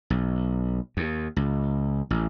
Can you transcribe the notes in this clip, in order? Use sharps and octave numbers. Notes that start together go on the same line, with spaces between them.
B1
D#2
C#2
A1